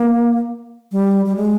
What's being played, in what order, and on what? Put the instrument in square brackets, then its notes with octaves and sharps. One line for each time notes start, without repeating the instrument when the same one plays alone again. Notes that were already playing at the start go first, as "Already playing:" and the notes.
Already playing: [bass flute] A#3
G3
G3
G#3